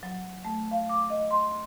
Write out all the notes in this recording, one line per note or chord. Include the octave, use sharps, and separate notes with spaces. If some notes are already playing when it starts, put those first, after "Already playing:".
F#3
A3
F5
D6
D#5
C6
D2